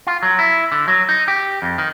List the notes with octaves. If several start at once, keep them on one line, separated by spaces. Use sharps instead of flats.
F4
F#3
E4
D3
F#3
D#4
G4
F2
D#3